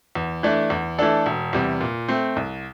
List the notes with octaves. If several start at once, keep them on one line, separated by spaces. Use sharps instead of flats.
E2
E3 A3 D4
E2
E3 A3 D4 A4
E1
E2 C3 G3
A#2
A3 C4
C2